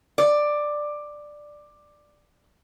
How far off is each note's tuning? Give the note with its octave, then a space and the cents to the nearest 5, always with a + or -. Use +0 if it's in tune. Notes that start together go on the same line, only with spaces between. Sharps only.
D5 +10